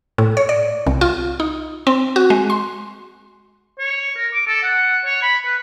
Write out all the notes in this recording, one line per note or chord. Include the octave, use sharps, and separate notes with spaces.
A2
C#5
D5
C2
F4
D#4
C4
F#4
G#3
C6
C#5
A#4
D6
A4
F#5
C#5
B5
B4